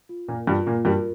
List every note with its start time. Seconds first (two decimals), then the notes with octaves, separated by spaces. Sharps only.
0.09 F4
0.28 A#2 A#3 A#4
0.47 G2 G3 F4
0.66 A#2 A#3 F4
0.85 G2 G3 A#4